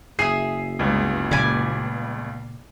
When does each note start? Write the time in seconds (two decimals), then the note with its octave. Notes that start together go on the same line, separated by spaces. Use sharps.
0.19 F#1 G#4 E5 D#6 C7
0.79 G1 C#2
1.31 A#2 C#3 D5 G#5 B5